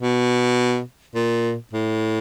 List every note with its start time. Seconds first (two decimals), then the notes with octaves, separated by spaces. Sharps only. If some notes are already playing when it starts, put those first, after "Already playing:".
0.01 B2
1.15 A#2
1.73 A2